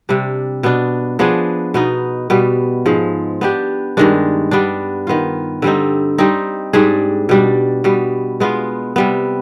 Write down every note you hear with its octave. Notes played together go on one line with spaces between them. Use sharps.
C3 G3 D4
B2 B3 D4
F3 B3 D4 G#4
B2 B3 D#4
B2 G3 B3
G#2 F3 G#3
B3 D4 G4
G2 D#3 G#3 D4
G3 B3 D4
D#3 B3 F4
D3 G3 C4 D#4
G3 C4 D#4
G#2 G3 D4 G#4
B2 G3 D4
B2 G3 B3
G#3 B3 F4
C3 G3 B3